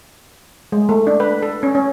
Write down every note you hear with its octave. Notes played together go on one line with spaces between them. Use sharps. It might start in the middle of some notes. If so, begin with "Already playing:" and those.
G#3
A3
D4
B4
A4
C#4
C#4